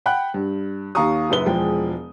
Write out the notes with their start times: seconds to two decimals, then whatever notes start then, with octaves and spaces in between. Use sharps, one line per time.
0.06 F#5 G5 B5 F#6
0.34 G2
0.95 D#2 G4 F5 A#5 C#6 D#6
1.30 F#1 F#2 B4 G7
1.46 E1 F3 G#3 G5